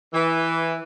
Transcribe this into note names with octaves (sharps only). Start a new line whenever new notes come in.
E3